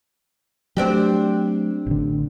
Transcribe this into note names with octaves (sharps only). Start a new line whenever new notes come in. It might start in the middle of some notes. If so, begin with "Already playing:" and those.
F#3 A3 C4 D4 G4
A1 D3